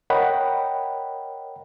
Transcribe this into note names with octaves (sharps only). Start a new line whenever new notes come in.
A#4 C#5 D#5 F#5 G5 B5